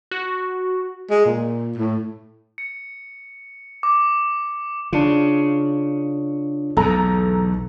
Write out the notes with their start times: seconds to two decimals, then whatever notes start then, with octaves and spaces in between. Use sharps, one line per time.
0.11 F#4
1.11 G#3
1.25 A#2
1.78 A2
2.58 C#7
3.83 D6
4.93 C#3 D4 F4
6.77 B1 E2 A4 A#5